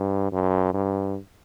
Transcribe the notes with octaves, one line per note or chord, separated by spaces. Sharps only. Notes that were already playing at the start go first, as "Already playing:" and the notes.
Already playing: G2
F#2
G2